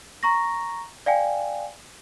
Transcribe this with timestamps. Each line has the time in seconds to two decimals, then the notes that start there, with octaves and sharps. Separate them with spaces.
0.23 A#5 C#6 A#6
1.06 D5 F5 G5 G#5